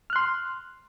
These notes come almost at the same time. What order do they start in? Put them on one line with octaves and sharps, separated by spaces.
F6 F#6 C6